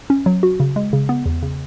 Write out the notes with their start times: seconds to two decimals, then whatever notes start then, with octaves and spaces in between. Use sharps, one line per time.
0.10 C#4
0.26 F#3
0.43 F#4
0.60 C#3
0.76 G#3
0.93 C#3
1.09 B3
1.26 E2
1.42 C#3